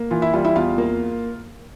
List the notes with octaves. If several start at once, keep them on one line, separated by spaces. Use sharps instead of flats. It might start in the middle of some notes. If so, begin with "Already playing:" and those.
Already playing: A#3
E3 F4
E4 E5
G3 F4 F5
E4 E5
E2 F4 F5
A#3